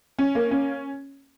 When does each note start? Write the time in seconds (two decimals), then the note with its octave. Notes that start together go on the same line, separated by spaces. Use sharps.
0.19 C#4
0.35 A#3
0.51 C#4